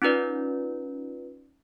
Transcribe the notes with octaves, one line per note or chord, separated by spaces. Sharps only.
C#4 D#4 F4 B4 D5